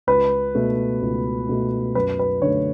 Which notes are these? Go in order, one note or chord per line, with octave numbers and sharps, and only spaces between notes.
C#2 B4
B2 A3
C#2
B2 A3
F#2 B4
B4
D3 A3 C#5